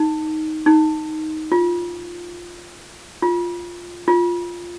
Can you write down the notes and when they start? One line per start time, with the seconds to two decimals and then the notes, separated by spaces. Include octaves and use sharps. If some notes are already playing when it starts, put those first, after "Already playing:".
Already playing: D#4
0.66 D#4
1.52 F4
3.22 F4
4.08 F4